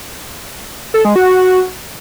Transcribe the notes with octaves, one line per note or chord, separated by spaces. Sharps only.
A4
G#3
F#4